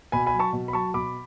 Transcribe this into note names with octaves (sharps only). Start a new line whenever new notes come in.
B2 G#5 B5
G#5 B5
F#3
A5 C#6
B2
B5
F#3 A5 C#6
B2 B5 D6